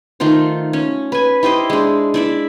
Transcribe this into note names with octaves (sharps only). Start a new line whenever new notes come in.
D#3 A3 F4 C5
C#4
B4 G#5
E4 G4 C5 D#5
G#3 D4
E4 D5 E5